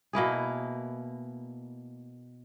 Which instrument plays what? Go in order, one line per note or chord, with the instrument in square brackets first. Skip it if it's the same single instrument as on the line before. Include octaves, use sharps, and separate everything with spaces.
[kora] B2 A#3 E4 G#4